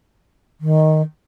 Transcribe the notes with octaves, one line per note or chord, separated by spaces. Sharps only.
D#3